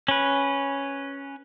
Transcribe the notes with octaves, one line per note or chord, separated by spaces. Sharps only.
C#4 B4